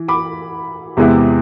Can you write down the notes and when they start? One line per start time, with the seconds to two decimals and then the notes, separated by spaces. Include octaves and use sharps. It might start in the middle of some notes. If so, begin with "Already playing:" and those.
Already playing: E3
0.08 B5 D6
0.97 E2 C3 G#3 B3 E4